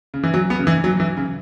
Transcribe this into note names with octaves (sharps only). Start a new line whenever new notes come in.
C#3
E3
F#3
B3
C#3
E3
F#3
E3
C#3